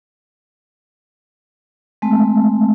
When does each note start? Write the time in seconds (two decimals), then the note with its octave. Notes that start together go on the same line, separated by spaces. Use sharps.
2.02 G#3 A3 C4 A5